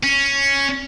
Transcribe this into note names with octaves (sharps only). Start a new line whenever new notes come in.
C#4